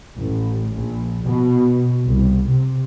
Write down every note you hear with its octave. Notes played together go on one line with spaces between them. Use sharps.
A1
A#1
B2
C2
C3